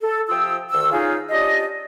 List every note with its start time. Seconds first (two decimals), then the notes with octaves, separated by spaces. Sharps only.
0.02 A4
0.28 C3 F3 F4 G5 D#6 E6
0.71 D2 D#3 E6
0.93 C#4 D#4 F4 G#4
1.30 C#4 D4 F4 G4 D5 D#5